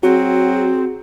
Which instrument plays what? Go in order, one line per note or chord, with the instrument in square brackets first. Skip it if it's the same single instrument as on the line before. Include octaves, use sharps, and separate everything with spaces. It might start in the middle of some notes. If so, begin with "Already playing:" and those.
[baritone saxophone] F#3 [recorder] C4 [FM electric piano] F#4 [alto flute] G#4